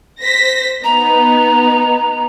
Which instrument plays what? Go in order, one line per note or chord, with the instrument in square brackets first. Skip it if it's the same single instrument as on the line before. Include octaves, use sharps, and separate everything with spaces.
[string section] C5 A#6 B6
[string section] B3 D#4 [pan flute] A#5